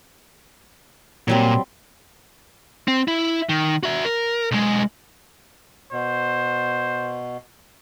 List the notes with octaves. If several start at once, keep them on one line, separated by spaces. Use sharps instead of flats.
A#2 F#3 G3 C4
C4
E4
D#3
F#4 E5
A#4
B1 G#3
B2 C5